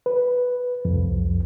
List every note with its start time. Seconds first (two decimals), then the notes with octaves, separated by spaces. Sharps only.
0.06 B4
0.85 C2 F2